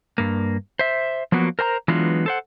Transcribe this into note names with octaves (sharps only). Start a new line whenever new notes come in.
G2 A#3
C5 E5
F3 F#3 A#3 B3 F#4
A#4 C5 G#5 A#5
E3 F#3 G#3 B3 D4 F4
A4 C5 F#5